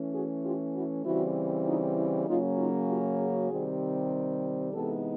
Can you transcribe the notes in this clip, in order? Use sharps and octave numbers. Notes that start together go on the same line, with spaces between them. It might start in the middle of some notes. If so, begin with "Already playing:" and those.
Already playing: E3 A3 C#4
F#4 G#4
F4 G4
E4 F#4
C#3 E3 G3 C4 E4 F#4
D#4 F4
E4
C#3 F#3 A#3 C#4 D#4 F4
D#4 F4
F4 G4
F#4 G#4
C3 D#3 G3 C4
C3 E3 G#3 B3 D#4 G4 A4